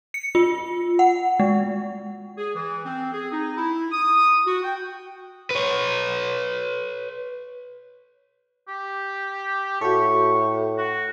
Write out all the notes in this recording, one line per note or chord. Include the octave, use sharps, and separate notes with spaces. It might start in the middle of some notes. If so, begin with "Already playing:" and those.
C#7
F4
F#5
G#3
G#4
E3
C4
G#4
D#4
E4
D#6
F#4
G5
B4 C#5
G4
A2 F#4 A4 C#6
F#4